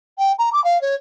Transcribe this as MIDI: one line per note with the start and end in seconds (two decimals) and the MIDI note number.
0.18 0.32 79
0.38 0.50 82
0.53 0.63 86
0.64 0.80 77
0.81 0.95 73